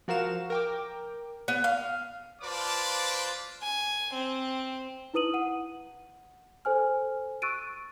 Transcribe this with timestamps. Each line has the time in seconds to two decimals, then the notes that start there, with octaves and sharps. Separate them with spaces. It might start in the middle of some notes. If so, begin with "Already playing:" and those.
0.08 F3 F#4 A#4 F5 E7
0.50 A#4 G5 D6
1.48 B3
1.64 F5
2.42 F4 B4 C5 D5 A5 D6
3.63 G#5
4.14 C4
5.14 D#4 E4 B4 D#6 D#7 F#7
5.34 F#5 D#7
6.65 A4 C5 G#5 F6
7.42 C#6 E6 F#6 A6 D7 D#7